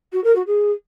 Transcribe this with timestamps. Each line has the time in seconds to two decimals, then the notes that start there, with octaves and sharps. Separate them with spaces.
0.12 F#4
0.24 A#4
0.35 F#4
0.46 G#4